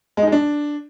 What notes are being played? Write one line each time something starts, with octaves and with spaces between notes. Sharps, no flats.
G#3
D#4
G#3
D4